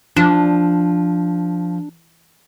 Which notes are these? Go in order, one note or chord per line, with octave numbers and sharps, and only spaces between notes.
F3 D4